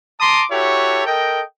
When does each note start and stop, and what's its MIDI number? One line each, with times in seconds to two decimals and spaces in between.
0.20 0.45 81
0.20 0.45 82
0.20 0.45 84
0.20 0.45 86
0.20 0.45 87
0.51 1.03 64
0.51 1.03 66
0.51 1.03 67
0.51 1.03 69
0.51 1.03 73
1.07 1.43 69
1.07 1.43 70
1.07 1.43 75
1.07 1.43 79